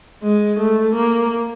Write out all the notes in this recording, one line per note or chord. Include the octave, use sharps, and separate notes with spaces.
G#3
A3
A#3